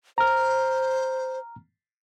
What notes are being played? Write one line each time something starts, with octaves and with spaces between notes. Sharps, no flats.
C5 A#5 F6